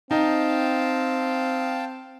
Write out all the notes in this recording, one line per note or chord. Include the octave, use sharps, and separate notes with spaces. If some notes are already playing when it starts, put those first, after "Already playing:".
C4 D#4 F5 G5 A5